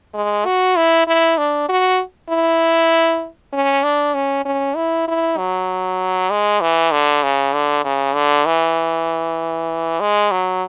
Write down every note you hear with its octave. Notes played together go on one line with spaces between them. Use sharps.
G#3
F#4
E4
E4
D4
F#4
E4
C#4
D4
C#4
C#4
E4
E4
F#3
G#3
E3
D3
C#3
D3
C#3
D3
E3
G#3
F#3